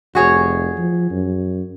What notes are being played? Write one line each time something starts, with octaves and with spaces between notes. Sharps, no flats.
F1 F#4 G#4 C#5
F3
F#2